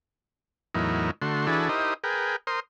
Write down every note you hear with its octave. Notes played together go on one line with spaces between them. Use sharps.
E2 A2 F#3 D#4 E4 A#4
D3 A3 F#4 C6
E3 D4 E4 F#4 G#4 A4
D#4 E4 G4 A#4 C5 D#5
G#4 A#4 B4 G5
A#4 C5 C6 D#6